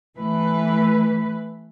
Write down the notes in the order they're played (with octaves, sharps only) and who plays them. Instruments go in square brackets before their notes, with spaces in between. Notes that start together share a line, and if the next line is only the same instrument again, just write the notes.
[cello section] E3 A3 B4